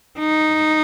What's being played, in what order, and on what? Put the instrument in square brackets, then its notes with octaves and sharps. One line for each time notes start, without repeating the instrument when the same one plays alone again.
[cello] D#4